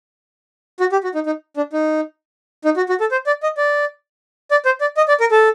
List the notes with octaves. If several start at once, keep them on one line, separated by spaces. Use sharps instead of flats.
F#4
G4
F#4
D#4
D#4
D4
D#4
D#4
F#4
F#4
A4
C5
D5
D#5
D5
D5
C5
D5
D#5
D5
A#4
A4